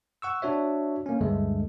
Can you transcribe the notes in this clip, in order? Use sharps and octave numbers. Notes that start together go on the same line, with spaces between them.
F#5 C#6 E6
D4 F#4 C#5 E5
A#3 C#4
D2 G2 D3 G#3 A3